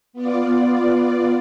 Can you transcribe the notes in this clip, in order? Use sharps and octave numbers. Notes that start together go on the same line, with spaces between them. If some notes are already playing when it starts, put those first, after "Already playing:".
B3 F4 D5